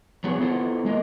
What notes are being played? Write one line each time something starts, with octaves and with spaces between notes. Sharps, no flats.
F3 F#3 B3 F#4 G#4
B3 E4 F4 A4 C5
G#3 A#3 D#5